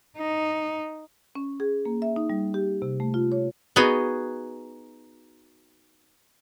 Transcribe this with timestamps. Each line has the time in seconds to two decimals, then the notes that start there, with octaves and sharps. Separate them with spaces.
0.18 D#4
1.35 C#4
1.60 G#4
1.85 A#3
2.02 E5
2.16 D#4
2.30 G3
2.54 G4
2.82 C3
3.00 A3
3.14 F4
3.32 C#5
3.76 B3 D#4 F#4 G#4